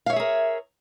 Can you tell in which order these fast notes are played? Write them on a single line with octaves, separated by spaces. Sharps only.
F5 C#5 E5 G#4 A#4